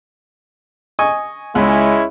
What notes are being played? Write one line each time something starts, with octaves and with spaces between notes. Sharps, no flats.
D#5 G#5 C#6
C#2 G#3 C#4 E4